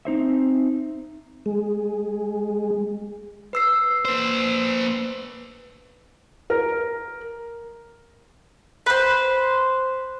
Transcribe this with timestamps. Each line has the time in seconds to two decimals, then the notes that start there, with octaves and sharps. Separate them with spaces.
0.05 C4 D#4 C5 E5
1.46 G#3
3.53 B4 E6 C7
4.05 A#3 C5
6.50 A#4
8.86 B4 C5